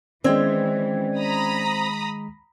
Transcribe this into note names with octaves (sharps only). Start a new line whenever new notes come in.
D#3 E3 G#3 C4 C#4 D5 G5 G#6
A#5 B5 D#6